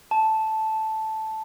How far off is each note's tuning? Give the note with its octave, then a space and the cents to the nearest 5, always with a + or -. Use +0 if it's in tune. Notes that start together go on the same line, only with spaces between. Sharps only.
A5 -5